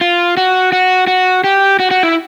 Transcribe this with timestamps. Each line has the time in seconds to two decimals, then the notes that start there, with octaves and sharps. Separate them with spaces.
0.01 F4
0.37 F#4
0.72 F#4
1.07 F#4
1.44 G4
1.79 F#4
1.91 F#4
2.03 E4